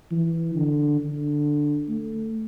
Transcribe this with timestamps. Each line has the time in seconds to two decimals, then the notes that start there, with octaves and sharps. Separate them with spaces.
0.11 E3
0.55 D3
1.00 D3
1.89 A3